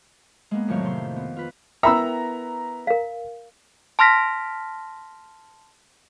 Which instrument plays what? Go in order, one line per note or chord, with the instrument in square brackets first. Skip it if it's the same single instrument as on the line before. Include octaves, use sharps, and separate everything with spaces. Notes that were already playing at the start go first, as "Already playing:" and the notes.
[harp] G#3 A#3 B3
F2 A2 D#3 F#3 C#5 F5
C3 C6
B3
F4 B4
[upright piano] B3 E4 A#4 [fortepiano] E5 B5 E6 [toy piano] G5 [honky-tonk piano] A#5
[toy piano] A#4 F5
[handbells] A5 C6 F6 A#6 B6